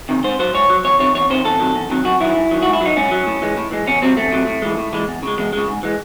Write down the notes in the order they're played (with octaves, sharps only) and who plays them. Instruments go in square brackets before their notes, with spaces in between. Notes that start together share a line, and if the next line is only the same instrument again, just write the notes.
[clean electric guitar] C3 D#3
G#2 C5
F#3 C5
G#2 C#5
F#3
E2 C#5
C3 D#3 C#5
E2 C#5
C3 D#3 C5
E2 A4
C3 D#3 F#3
E2
C3 D#3 F#3
F#2 F#4
D#3 F#3 E4
F#2
D#3 F#3
G#2 F#4
E4
F#3 D#4
G#2 C#4
F#3
A2
E3 G#3
A2
E3 G#3
E2 C#4
C3 F#3 C4
E2 A3
C3 F#3
A2
E3 G#3
A2
E3 G#3
E2
C#3 G#3
E2 G#3
C#3 G#3
G#2
E3 G#3